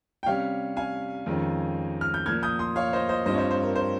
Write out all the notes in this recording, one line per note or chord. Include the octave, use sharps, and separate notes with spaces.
G5
C3 G3 C#4 C#5 F5
F5 G#5
F2 D#3 G#3 C#4 F4
F6
G6
A#2 F3 A#3 F6 G#6
D#6 G6
C6 D#6
C#5 F5
C5 D#5
C5 D#5
G2 G3 C4 F4 C5 D#5
C#5
C5 D#5
C5
A#4
C5